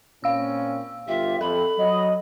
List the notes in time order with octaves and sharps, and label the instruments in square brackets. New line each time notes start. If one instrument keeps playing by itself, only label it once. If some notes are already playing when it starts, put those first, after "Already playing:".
[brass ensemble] A#2 C4 C#4 [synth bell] F5 E6
[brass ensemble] G1 F4 G4 [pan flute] E5
[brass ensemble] F2 [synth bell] A4 [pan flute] B5
[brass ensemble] F#3 [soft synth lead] D#5